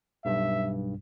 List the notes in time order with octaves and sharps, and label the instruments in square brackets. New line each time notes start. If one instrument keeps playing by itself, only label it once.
[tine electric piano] B1 G2 [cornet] E5